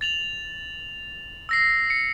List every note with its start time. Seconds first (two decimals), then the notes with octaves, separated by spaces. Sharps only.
0.01 A6 F7 F#7
1.49 E6 A#6 C7
1.90 C#7